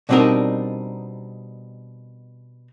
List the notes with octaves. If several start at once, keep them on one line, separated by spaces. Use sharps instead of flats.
B2 G3 C4 D4 D#4 A#4